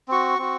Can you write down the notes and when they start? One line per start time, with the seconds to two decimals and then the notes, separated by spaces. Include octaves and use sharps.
0.08 C4 F#4 C#6
0.39 C4 F#4